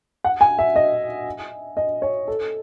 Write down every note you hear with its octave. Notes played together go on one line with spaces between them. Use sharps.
F#5
G#5
E5
D#5
D#5
C#5
A4